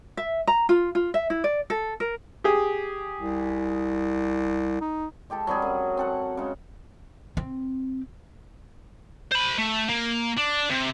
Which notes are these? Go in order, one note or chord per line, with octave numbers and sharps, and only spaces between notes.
E5
A#5
F4
F4
E5
E4
D5
A4
A#4
G4 G#4
C2
D#4
G#3 G4 A4 A5
F#3 G3 C4 G#4
F#2
C4 A4 F#5
C#3 G#3
C4
C5 B5
A3
A#3
D4
C3